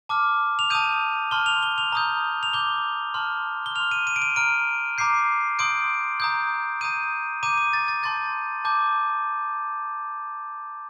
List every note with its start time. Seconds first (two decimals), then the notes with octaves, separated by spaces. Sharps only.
0.09 A5 D6 F6
0.59 F7
0.70 A5 D#6 G6 D#7
1.31 A5 C6 F6 G7
1.46 F7
1.63 G7
1.78 F7
1.92 A#5 D#6 G6
2.43 F7
2.53 A#5 D6 G6 G7
3.14 A5 C6 F6
3.66 G7
3.75 F6 F7
3.80 C6
3.91 D#7
4.07 D#7
4.16 D7
4.22 D#7
4.36 A#5 F6 D7
4.98 A#5 D6 G6 C7
5.59 C6 D#6 G6 D7
6.20 A#5 D#6 G6
6.81 A#5 D#6 G6 D#7
7.43 A#5 D6 G6 D#7
7.58 D#7
7.73 A6
7.88 A6
8.03 A5 C6 G6 A6
8.64 A5 D6 G6